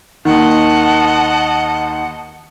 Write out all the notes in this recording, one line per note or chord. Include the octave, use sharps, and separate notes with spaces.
D#2 D#3 D#5 F#5 A5